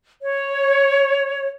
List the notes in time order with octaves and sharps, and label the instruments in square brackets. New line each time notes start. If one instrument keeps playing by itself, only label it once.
[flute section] C#5